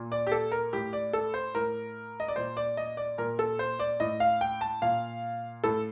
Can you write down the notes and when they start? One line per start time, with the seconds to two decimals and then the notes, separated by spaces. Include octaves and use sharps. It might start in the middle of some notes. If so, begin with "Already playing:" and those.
Already playing: A#2
0.12 D5
0.27 G4
0.32 A4
0.52 A#4
0.73 A2 G4
0.93 D5
1.13 A4
1.34 C5
1.55 A2 A#4
2.20 D#5
2.28 D5
2.36 A#2 C5
2.57 D5
2.77 D#5
2.97 D5
3.18 A#2 A#4
3.39 A4
3.59 C5
3.79 D5
4.00 A2 D#5
4.20 F5
4.41 G5
4.61 A5
4.82 A#2 F5
5.64 A2 A4